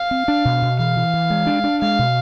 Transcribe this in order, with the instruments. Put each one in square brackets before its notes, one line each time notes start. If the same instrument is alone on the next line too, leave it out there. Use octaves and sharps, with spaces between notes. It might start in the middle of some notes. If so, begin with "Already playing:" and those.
Already playing: [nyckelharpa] F5
[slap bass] C4
D4
B2
B2
[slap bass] E3 [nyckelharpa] F5
[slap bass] E3
E3
G#3
D4
D4
[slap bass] G#3 [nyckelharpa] F5
[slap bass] B2